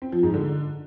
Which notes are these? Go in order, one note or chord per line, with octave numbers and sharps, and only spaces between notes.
C4
F3
G#2
D3